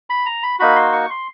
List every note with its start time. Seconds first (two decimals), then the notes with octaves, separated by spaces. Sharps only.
0.10 B5
0.26 A#5
0.43 B5
0.59 A#3 D#4 F#4 B5
0.76 C6
0.92 C#6
1.10 C6